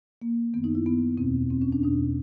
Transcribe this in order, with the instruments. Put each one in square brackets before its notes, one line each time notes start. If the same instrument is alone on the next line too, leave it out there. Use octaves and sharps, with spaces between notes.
[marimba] A#3
D#3 B3
F#2
D#4
E4
B3
E2 B2 C4
C4
C#4
D4
E2 B2 D4